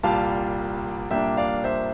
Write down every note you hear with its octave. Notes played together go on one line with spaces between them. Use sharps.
C2 A#2 G3 F5 A5
C2 A#2 G3 A#3 D4 E5 G5
D5 F5
C5 E5